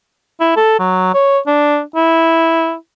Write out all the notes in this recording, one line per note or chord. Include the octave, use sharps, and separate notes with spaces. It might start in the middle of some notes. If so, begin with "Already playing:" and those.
E4
A4
F#3
C#5
D4
E4